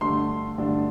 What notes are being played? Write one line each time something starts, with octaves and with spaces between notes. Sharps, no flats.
G2 D3 A3 D4 C6
G2 D3 A3 D4